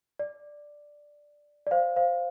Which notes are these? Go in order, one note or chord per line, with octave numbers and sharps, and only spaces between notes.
D5
D5
C5 F5
C5 F5